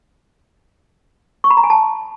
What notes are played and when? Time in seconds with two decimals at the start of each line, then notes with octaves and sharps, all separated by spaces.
1.44 C#6
1.51 B5
1.57 A#5
1.63 G#5
1.70 A5